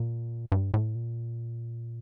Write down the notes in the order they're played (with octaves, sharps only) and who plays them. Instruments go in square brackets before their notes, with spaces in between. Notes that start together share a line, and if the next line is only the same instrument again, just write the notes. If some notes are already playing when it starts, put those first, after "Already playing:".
Already playing: [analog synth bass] A#2
G2
A2
A#2